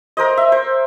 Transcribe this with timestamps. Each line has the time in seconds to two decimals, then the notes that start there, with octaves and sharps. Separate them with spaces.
0.17 A#4 C5 D#5
0.37 E5
0.52 C5